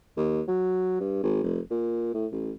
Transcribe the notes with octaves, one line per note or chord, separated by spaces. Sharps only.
D#2
F#3
G2
G#1
F1
A#2
A2
A1